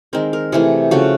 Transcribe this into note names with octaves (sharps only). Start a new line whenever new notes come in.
D#3 G#3 C4 A#4
A#4
C3 E3 A3 G#4
C#3 F3 A3 F#4